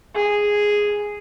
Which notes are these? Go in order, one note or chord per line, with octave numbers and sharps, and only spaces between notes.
G#4